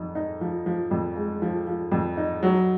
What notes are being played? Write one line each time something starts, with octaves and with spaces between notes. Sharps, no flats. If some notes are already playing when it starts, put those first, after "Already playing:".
Already playing: F2 D#4
D#4
F3
F3
F2
G#3
F3
F3
F2
D#4
F#3